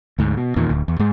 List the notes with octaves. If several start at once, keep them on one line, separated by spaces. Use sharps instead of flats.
D2 G#2
B2
E2 A#2 D#3
D1 D2
E2
G#2 G#3